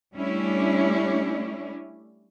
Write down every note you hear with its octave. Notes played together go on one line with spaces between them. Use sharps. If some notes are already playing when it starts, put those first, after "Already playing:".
G3 A3 C#4 D4 E4